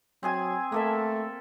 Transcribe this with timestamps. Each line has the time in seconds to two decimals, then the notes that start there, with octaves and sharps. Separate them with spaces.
0.23 F#3 C4 G#4 G#5
0.72 A3 A#3 A4 E5